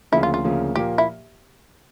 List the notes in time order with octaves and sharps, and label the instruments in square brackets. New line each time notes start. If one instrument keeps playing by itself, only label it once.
[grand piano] D2 C#3 F3 A#3 [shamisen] E4
[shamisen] F4
F4
[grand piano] D2 C#3 F3 A#3
[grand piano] A#2 F3 A#3 [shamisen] G4
[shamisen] E4